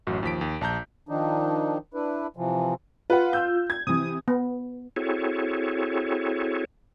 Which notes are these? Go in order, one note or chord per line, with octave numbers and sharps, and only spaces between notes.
A1 F#2 F#4
D#2 F3 B6 D7
D#2
A#1 A5 A#5 G6
D#3 F3 D4 D#4
D4 E4 B4
C3 E3 F3
F4 B4 F#5
E6 G6
G#6
C3 E3 D#6
B3
C4 E4 F#4 G#4 A4 C#5